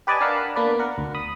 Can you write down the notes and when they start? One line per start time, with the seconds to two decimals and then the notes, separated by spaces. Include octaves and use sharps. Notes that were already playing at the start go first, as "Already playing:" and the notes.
0.07 G4 B4 D5 D#5 G#5 A5
0.21 D4 A#4 F5 F#5 A5 B5
0.56 A#3 B3 D4 B4 D5
0.79 A#4 F#5
0.98 D2
1.15 B5 D#6